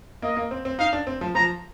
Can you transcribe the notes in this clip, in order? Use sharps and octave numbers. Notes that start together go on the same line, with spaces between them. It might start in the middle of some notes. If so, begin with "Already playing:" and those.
A#3 D#5
A#3
C4
C4
D#4 F5
D4
C4
F3
F3 A#5